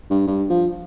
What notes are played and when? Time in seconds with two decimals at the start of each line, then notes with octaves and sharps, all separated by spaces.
0.10 G2
0.27 G2
0.50 F3